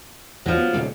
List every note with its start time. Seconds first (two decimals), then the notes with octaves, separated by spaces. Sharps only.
0.46 E2 F3 F#3
0.57 B3
0.73 D#1 C#2 C3